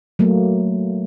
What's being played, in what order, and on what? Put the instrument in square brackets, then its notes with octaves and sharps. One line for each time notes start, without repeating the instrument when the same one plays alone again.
[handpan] F#3 A3 A#3